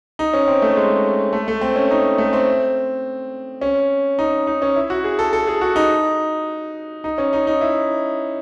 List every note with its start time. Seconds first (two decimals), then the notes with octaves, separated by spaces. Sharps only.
0.19 D#4
0.34 C#4
0.48 C4
0.62 A3
0.76 G#3
1.33 A3
1.48 A3
1.61 C4
1.76 C#4
1.91 D#4
2.18 A3
2.33 C4
3.62 C#4
4.19 D#4
4.47 D#4
4.62 C#4
4.76 E4
4.90 F#4
5.04 G#4
5.19 A4
5.33 A4
5.47 G#4
5.61 F#4
5.76 D#4
7.04 D#4
7.18 C#4
7.33 D#4
7.47 D#4
7.61 E4